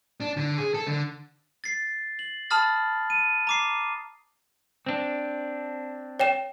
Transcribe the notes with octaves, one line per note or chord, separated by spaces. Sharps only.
D4
D3
G#4
A4
D3
A6 C7
F#7
A5 B5 D#6 F6 A6
D#7
A#5 D6 C7
C4 D4
C#5 G5 E7